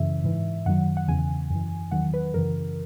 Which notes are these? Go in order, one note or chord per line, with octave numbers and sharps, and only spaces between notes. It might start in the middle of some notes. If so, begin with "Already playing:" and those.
Already playing: F#2 C#3 E3 E5
G#2 E3
F#2 D#3 F#3 F#5
F#5
E2 C#3 E3 G#5
F#2 E3
E2 D#3 F#3 F#5
B4
F#2 C#3 E3 A#4